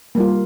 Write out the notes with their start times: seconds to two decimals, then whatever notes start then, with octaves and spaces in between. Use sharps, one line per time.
0.15 A#3
0.18 G3
0.20 F4